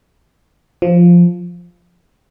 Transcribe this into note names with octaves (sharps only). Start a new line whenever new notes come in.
F3